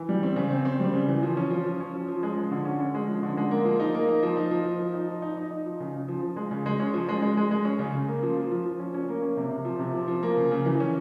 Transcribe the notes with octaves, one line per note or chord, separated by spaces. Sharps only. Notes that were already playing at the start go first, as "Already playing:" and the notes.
Already playing: E3
G3
C4
C#3
C4
C4
G3
C#3
E3
F3
C#4
F3
F3
C#4
F3
F3
G#3
F3
D3
C#4
C#4
G#3
F3
D3
G#3
A#3
F3
D#4
A#3
D#4
F3
D#4
F3
F3
F3
D#4
F3
D#4
D#4
D#4
F3
C#3
C#3
F3
F3
G#3
C#3
G#3
C#4
F3
G#3
G#3
G#3
G#3
C#4
C#3
C#3
A#3
F3
F3
F3
F3
C#4
C#4
A#3
C#4
C3
C3
F3
C3
F3
F3
A#3
C#3
C#3
E3
C#4